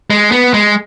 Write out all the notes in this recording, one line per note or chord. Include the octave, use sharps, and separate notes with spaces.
G#3
B3
G#3